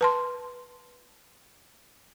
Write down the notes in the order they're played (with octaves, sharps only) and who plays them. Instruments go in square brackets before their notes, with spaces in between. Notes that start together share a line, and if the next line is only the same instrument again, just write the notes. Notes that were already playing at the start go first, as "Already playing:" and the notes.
[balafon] B4 A5 C6